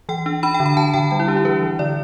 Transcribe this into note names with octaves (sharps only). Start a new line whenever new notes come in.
E3 G5
D4
D4 B5
G5
D3
B5
D3 A5
D3 G5
G3 G5
E4
D4 G4
E4
E3 B4
E3
D3 D5